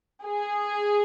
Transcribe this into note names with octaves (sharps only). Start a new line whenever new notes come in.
G#4